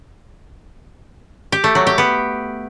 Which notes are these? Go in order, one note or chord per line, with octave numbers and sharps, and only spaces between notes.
G4
A3
F#3
G4
B3